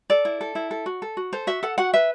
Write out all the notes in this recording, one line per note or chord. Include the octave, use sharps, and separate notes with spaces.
A4 D5
E4
A4
E4
A4
F#4
A4
F#4
A4 C5
F#4 E5
A4 F#5
F#4 F#5
B4 E5